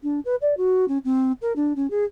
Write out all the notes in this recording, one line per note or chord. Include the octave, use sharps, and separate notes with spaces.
D4
B4
D5
F#4
C#4
C4
A#4
D4
C#4
G#4